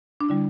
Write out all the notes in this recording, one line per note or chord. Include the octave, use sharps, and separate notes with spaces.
D4
D3 G3 E4